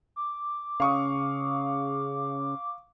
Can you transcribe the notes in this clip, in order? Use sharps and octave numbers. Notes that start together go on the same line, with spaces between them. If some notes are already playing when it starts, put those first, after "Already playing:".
D6
C#3 F5 C#6 D#6